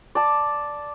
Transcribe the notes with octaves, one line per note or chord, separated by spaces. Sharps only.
D5 A5